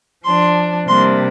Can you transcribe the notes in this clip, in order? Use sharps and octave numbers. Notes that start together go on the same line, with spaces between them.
F3 D4 C6
C3 G3 A#3 D4 C6